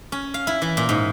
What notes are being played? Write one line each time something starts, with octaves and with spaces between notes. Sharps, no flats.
C#4
F5
E4
E3
A#2
G#2